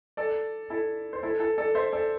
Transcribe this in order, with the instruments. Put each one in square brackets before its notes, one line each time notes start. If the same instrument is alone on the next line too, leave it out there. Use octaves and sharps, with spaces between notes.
[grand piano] A4 D5
E4 A4
C5
E4 A4
E4 A4
A4 D5
C5 E5
A4 D5